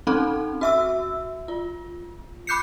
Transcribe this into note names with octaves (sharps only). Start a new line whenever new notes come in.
C4 C#4 D#4 A4
F#4 E5 E6
F4
B5 D6 F#6 G6 C7 C#7